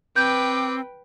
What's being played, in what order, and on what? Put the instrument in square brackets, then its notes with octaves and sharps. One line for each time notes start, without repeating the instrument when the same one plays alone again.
[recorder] C4 [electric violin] B4 G5 [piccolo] D6 [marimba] G6